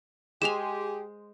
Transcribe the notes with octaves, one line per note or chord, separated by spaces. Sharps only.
G#3 G4 G#4 C5 G#5 E7 F7